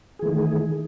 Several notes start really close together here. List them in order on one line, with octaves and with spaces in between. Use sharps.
G#4 E3 A3 D#3